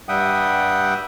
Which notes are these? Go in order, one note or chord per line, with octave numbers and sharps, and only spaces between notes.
G2 G3 E5 F#5 G5 D#6